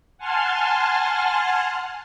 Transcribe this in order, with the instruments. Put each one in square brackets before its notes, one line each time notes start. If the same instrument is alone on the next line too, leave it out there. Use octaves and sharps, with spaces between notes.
[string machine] F#5 G#5 A5 C6 F6